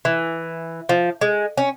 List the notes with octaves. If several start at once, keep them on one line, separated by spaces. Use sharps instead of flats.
E3
F3
G#3
C#4